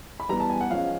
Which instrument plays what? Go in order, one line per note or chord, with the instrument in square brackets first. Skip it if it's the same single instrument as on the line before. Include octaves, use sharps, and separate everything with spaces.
[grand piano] B5
E3 G3 B3 A#5
A5
G#5
F#5
F3 G#3 C#4 F5